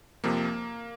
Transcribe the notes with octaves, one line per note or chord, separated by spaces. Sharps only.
F2 C3 F3 A#3